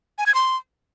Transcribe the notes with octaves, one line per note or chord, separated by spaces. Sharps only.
G#5
G#6
C6